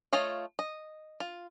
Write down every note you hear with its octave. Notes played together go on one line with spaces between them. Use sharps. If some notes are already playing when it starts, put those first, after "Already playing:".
A3 F4 C#5 D#5 F5
D#5
F4